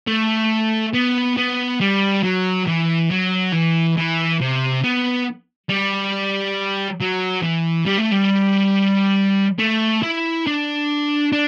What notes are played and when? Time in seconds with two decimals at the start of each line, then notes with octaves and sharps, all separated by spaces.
0.07 A3
0.94 B3
1.37 B3
1.81 G3
2.23 F#3
2.67 E3
3.11 F#3
3.53 E3
3.97 E3
4.41 C3
4.84 B3
5.70 G3
7.00 F#3
7.43 E3
7.87 G3
7.99 A3
8.12 G3
9.59 A3
10.03 E4
10.46 D4
11.33 D4